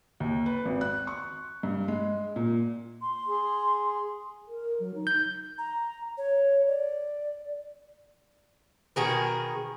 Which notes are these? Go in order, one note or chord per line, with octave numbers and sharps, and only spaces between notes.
D#2
B4
G#1
F#6
C#6
G2
G#3
A#2
C6
G#4
A#4
F#3
D#4
G6
A#5
C#5
D5
B2 D#3 G#4 A#4